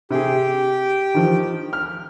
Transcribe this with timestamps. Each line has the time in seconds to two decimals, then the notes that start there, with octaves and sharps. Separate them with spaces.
0.11 C3 G4 G#4
1.14 D#3 F3
1.73 F6